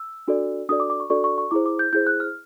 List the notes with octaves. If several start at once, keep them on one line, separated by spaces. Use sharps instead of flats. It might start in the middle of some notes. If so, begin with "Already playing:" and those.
Already playing: E6
D4 F#4 A4 D5
D4 F#4 A4 D5 D#6
D6
D6
C#6
D4 F#4 A4 D5 C#6
C#6
C#6
E4 G#4 C5 D6
D6
G6
E4 G#4 C5 G6
F#6
F6